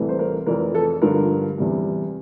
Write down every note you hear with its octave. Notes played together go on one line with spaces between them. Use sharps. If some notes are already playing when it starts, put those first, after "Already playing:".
Already playing: C2 C3 E3 A3
C5
A#4
F1 F2 E3 A#4
A4
G2 D3 F3 A#4
E2 C3 G3